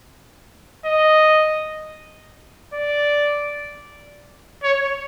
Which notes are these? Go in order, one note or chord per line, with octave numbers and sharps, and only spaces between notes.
D#5
D5
C#5